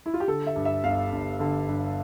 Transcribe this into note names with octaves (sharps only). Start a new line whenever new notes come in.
E4
F4
G4
D3 A4
E5
G2
E5
G1 F5
G1
D3
G2